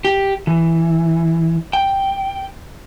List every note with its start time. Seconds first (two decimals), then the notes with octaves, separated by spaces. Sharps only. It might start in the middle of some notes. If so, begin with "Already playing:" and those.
0.05 G4
0.47 E3
1.73 G5